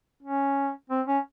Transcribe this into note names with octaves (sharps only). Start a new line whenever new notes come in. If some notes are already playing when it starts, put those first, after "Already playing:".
C#4
C4
C#4